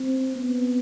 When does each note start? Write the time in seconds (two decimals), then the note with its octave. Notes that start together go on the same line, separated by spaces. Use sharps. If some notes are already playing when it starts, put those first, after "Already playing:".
Already playing: C4
0.36 B3